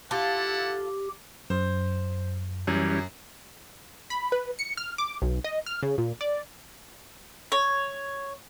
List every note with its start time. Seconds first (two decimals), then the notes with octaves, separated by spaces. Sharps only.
0.11 E4 F4 G4 A4 F#5 A5
1.50 F#2 C5
2.67 F#2 E3 G3 C#4
4.10 B5
4.32 B4
4.59 C#7
4.77 F6
4.98 D6
5.22 B1
5.44 D#5
5.66 F6
5.83 C#3
5.98 A#2
6.21 D5
7.52 C#5